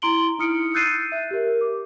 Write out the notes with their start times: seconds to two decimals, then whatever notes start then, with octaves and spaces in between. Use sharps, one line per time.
0.02 E4 A#5 C6 D7 F#7 G7
0.38 D#4 E4 D#6 F6 C#7 D7
0.74 E6 F#6 G6 A6 C7 D#7
1.12 E5
1.31 G4 A#4
1.61 D6